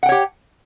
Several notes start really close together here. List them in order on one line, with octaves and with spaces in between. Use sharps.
F#5 G5 C#5 G4